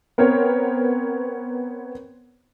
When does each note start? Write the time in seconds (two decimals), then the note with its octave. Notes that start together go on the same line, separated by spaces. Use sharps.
0.18 B3 C4 A#4 C5 C#5